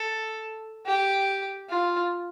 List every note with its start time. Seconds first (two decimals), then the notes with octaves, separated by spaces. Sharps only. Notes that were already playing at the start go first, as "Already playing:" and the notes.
Already playing: A4
0.86 G4
1.69 F4